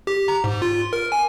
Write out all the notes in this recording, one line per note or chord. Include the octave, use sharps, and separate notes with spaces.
G4
A#5
G#2
F4
A#4
G#5